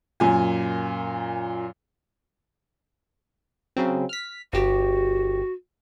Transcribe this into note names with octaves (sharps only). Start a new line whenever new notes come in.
F#2 A#2 G#5
C#3 F#3 C4
F6 B6
G1 F#4 G4